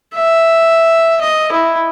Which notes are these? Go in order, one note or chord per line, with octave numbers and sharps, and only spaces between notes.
E5
D#5
E4